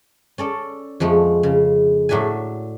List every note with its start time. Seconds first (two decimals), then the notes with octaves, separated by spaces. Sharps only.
0.38 C#4 A4 D5
1.00 F2 F3 G#3 A3
1.43 C#3
2.09 A2 F#3 D4 E5 G#5